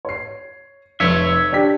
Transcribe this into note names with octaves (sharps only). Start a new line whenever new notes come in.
C#5 C7
F1 C#5 E5
D4 G4 B6